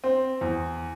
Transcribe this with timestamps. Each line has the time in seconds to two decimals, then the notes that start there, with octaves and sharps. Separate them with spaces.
0.04 C4
0.41 E2